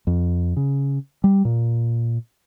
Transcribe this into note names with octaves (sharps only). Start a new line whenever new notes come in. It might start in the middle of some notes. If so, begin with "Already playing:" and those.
F2
C#3
G3
A#2